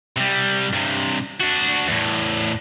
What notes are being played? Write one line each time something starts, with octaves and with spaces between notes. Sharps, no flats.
C3 G3
G2 C3
D4 F#4
E2 A2